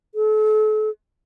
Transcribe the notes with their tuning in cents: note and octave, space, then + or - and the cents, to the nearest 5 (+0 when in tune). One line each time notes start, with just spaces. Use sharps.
A4 -40